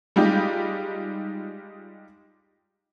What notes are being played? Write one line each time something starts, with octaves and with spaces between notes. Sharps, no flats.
G3 G#3 D#4 F4 G4